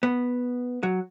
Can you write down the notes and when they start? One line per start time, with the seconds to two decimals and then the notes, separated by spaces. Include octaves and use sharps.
0.03 B3
0.83 F#3